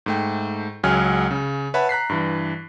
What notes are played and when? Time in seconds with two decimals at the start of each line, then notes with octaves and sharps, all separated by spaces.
0.06 G#2 A3 G5
0.84 C#2 F#3 G#3 G#4 G#5 F6
1.31 C#3
1.74 B4 C#5 E5 F#5 A5 B5
1.89 A#5 F#6 B6 C7
2.10 G2 E3